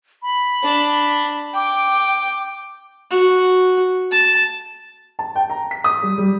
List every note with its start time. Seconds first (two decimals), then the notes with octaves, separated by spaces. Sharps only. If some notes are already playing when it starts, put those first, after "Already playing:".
0.22 B5
0.63 D4
1.55 G5 D6
3.11 F#4
4.12 A5
5.19 A5
5.36 G5
5.50 A#5
5.71 B6
5.84 D#6
6.02 G3
6.18 G3